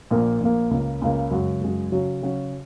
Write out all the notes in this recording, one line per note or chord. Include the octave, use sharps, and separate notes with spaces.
A#1 A#2 A#3
A#1 A#2 A#3
C#2 C#3 A#3
C#2 C#3 A#3
F#2 C#3 G#3 F#4
F#2 C#3 G#3 F#4
C#3 F#3 C#4 F#4
C#3 F#3 C#4 F#4